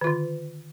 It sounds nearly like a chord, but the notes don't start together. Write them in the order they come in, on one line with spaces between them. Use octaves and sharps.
D#3 F4 D3